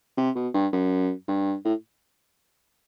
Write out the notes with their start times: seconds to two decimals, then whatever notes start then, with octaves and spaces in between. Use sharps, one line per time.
0.17 C3
0.35 B2
0.54 G2
0.73 F#2
1.28 G2
1.65 A2